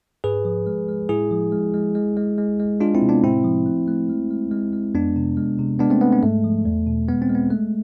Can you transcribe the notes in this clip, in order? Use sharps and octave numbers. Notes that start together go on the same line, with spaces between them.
G#2 G#4 B4
F3
G#3
G#3
A2 E4 G#4
F3
G#3
G#3
G#3
G#3
G#3
G#3
G#3 D4 F4
C4 E4
C3
B3 D4
A2 C4 E4
F3
A3
A3
G#3
G#3
G#3
G#3
F2 B3 D4
C3
G#3
C3
G#3 B3 D4
A3 C4
G#3 B3
B3
G#2 A3
F3
E2
B2
G#3 B3
C4
G#3
B3
A3